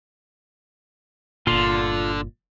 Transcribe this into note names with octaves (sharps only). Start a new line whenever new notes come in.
G1 A#2 D3 F4 C6